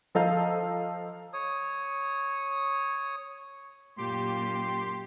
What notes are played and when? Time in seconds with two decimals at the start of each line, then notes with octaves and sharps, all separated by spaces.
0.15 F3 A4 D#5 F5 A#5 G6
1.33 C#5 D#6
3.98 F#2 A#2 G4 C6